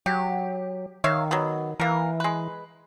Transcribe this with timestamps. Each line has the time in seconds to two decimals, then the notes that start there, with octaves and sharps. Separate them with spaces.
0.06 F#3 G4
1.04 D#3 C#5 E5 F5
1.31 F#3 B3
1.80 E3 A#3 A#4
2.20 G#3 B4